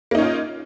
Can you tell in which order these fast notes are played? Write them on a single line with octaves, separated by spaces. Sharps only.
A#3 D#4 C#4 F4